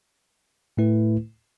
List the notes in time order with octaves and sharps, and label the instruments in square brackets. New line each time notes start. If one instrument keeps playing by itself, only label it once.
[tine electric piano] A2 A3 E4 B4